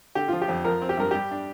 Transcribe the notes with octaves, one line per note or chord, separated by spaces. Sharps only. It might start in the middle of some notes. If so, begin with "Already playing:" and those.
D3 G4
F3 F4
G4
F2
F3 A#4
C4
G4
G2 A#4
G3 G4
D4